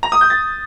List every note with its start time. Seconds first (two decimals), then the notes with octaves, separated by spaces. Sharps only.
0.03 A#5
0.12 D#6
0.21 G6
0.30 A6